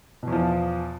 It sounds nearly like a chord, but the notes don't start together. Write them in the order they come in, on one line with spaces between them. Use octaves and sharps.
B2 E2 F3